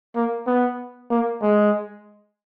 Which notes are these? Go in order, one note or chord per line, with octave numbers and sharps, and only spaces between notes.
A#3
B3
A#3
G#3